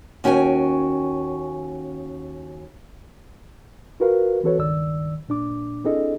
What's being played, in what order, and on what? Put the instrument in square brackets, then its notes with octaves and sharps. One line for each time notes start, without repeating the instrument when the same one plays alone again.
[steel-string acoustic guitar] D#2 C#4 F#4 G5 G#5
[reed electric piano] F4 F#4 A#4 B4 F5
E3 C4 F#4 A4 B4 C#5
C#2 G2 D#3 D5 E6
A#2 D4 D6
C4 D4 E4 G#4 A4 D#5